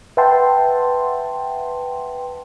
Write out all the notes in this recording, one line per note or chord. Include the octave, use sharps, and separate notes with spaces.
B4 E5 F#5 G5 A5 C6